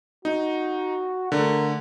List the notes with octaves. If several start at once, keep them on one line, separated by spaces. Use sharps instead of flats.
D#4 F#4
D3 A3 A#4